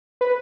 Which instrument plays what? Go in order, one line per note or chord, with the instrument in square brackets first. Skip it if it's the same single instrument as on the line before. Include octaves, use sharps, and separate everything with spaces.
[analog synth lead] B4